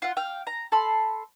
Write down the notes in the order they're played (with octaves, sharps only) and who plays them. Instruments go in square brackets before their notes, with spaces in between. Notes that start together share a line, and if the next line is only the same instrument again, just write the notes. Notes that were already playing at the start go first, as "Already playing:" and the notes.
[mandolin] F4 F#5
F5 G5
A#5
A4 B5 C6